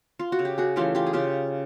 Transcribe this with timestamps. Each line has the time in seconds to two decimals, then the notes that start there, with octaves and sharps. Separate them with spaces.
0.19 F4
0.32 F#4
0.39 C#3
0.45 G4
0.58 F#4 G#4
0.76 E3 A3 C#4 F4 G4
0.95 F4 G4
1.07 G#4
1.13 C#3 F4 G4